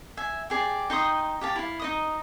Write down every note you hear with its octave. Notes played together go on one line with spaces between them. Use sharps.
E5 G#5
G4 G#4 D5
D#4 G5 C6 D#6
G4 F5 A5
E4 F5
D#4 D#5 D#6